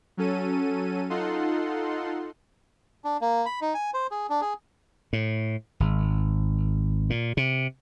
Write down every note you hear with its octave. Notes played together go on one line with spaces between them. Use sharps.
F#3 C#4 A4 D#7
D#4 F4 A4 F#5 C6
D4
A#3
B5
D#4
G#5
C5
G#4
D4
G#4
A2
G#1
A#2
C3